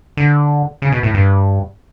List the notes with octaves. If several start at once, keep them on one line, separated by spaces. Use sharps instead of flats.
D3
C#3
B2
A2
G2